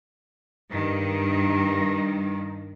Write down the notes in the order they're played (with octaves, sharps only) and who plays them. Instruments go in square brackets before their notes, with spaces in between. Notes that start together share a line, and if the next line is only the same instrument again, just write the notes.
[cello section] G2 D#3